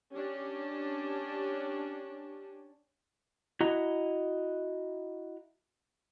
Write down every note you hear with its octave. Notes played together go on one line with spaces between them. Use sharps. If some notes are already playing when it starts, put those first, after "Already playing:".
C#4 D4 G4
E4 F#4 D#5 A#5